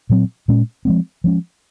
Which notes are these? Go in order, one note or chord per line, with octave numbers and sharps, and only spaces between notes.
A#2 F#3 C4
A#2 G#3 C#4
F3 G#3 C4
F3 G#3 C#4